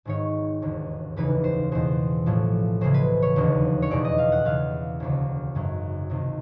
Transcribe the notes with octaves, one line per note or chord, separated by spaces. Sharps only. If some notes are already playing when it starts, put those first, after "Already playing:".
G#1 G#2 D#3 C#5
E1 D#2 D3
F1 D#2 C#3 E3 B4
C5
E2 B2 C5
A1 A2 F3
C#2 C#3 E3 C5
B4
C#5
E1 D#2 D3 F3
C#5
F1 E2 B2 D5
D#5
F5
F#5
E2 C#3 E3 F5
E1 D2 C#3
G#1 F#2 C#3
C#2 C3 D#3